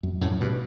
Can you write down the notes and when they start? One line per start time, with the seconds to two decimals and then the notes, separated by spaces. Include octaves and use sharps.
0.03 F#2
0.21 F#2 A2
0.40 G2 B2